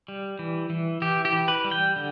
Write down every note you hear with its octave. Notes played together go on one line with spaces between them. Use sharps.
G3
E3
E3
E3 G4
G4
E3
B4
G3
G5
D3